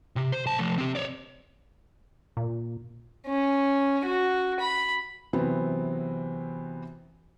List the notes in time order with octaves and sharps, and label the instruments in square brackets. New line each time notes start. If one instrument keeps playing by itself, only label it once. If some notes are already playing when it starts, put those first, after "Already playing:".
[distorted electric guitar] C3
C5
B1 A5
F3 A3
C4 G4
C#5 D5
[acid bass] A#2
[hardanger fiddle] C#4
F#4
B5
[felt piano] C3 E3 F#3 B3 C4